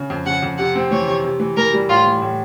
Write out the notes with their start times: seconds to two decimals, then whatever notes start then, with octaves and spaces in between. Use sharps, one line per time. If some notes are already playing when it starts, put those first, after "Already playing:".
Already playing: C#3
0.10 F2
0.26 C#3 F#5
0.43 F2
0.58 C3 F#5
0.75 C4
0.91 E3 C#5
1.08 C3
1.24 C3
1.40 E3
1.57 E3 A#4
1.73 G3
1.89 A2 F4
2.06 E3
2.22 A2